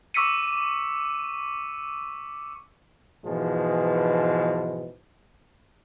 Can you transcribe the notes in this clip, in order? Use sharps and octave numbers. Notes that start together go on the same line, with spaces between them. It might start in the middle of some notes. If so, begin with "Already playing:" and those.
C#6 D6 E6 B6 C#7 D#7
G#2 B2 E3 F3 G#3